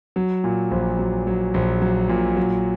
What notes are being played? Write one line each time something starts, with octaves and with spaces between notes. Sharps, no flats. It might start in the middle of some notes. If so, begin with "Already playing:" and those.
F#3
A#2
A#1
F#3
F#3
A#1
F#3
A#2
F#3